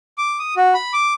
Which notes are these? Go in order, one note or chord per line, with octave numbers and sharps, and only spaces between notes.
D6
D#6
F#4
B5
D6